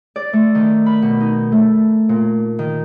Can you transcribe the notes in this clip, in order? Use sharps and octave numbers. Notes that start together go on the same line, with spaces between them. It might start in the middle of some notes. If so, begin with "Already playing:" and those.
D5
A3
D#3
B5
B2
D#4
A3
A#2
D#3